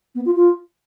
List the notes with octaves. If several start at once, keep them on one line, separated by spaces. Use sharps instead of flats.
B3
F4
F4